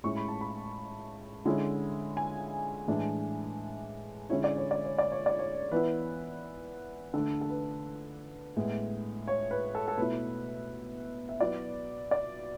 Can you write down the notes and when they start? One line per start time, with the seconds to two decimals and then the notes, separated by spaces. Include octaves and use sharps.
0.03 A2 G#3 C#4 E4 C#6
0.16 B5
0.28 A5
0.41 B5
1.45 D3 G#3 C#4 E4
2.17 G#5
2.88 A2 E3 G#3 D4
4.30 D3 G#3 C#4 E4 C#5
4.44 D5
4.57 C#5
4.71 D5
4.85 C#5
4.98 D5
5.12 C#5
5.26 D5
5.39 C#5
5.72 E3 B3 E4 B4
7.14 D3 A3 D4 A4
7.41 A4
7.50 B4
8.56 A2 G#3 B3
9.28 C#5
9.51 B4
9.75 A4
9.88 A4
9.98 B2 A3 E4 B4
11.29 E5
11.40 F#3 B3 E4 D5
12.11 D5